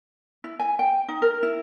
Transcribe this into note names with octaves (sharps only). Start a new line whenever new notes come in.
E4
G#5
G5
D#4
A#4
E4